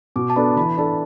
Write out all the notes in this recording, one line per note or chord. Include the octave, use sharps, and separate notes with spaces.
B2 D6
A5
B3 D4 A4 B5
E3 B5
D4 A4 A5